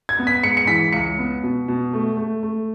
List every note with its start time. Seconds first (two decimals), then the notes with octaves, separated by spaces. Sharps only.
0.09 G#6
0.19 B3
0.27 B6
0.43 G#2 C#7
0.57 C#7
0.67 E3 B6
0.93 C#2 C#7
1.18 B3
1.43 B2
1.68 B2
1.93 A3
2.17 A3
2.43 A3